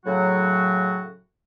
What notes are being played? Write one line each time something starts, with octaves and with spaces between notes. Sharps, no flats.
A2 C#3 F#3 F#4